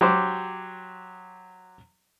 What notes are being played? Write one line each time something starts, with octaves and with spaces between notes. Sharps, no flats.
F#3 G4 C5 D6